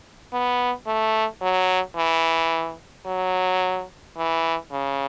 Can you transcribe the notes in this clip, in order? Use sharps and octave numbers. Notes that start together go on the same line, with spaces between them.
B3
A3
F#3
E3
F#3
E3
C#3